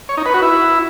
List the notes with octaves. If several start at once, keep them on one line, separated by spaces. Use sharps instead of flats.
C#5
D#4
B4
F#4
E4